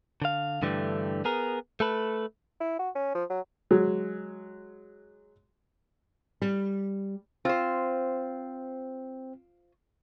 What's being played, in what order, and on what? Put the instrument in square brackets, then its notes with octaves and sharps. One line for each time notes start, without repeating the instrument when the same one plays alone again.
[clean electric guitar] D3 F5
G2 D3 E3 G3 A3
B3 G#4 A#4
A3 A4 B4
[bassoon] E4
F#4
C#4
F3
F#3
[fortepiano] F#3 G#3
[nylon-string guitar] G3
[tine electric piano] C4 [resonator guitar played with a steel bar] F4 C5